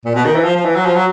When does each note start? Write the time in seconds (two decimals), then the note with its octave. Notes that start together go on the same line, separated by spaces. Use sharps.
0.05 A#2
0.15 B2
0.25 D#3
0.35 E3
0.45 F3
0.56 F3
0.65 E3
0.76 F#3
0.85 F3
0.96 F#3